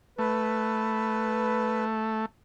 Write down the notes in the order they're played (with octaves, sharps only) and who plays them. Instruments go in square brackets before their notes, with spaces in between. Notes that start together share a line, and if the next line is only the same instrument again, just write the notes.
[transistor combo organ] A3 [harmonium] B4